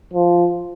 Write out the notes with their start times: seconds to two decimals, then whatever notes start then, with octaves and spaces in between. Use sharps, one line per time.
0.13 F3